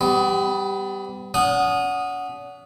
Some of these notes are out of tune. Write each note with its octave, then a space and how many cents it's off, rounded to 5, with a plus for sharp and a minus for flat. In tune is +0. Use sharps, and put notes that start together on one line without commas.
G3 +0 B3 +35
C#4 +45 F#5 -5 D#6 -10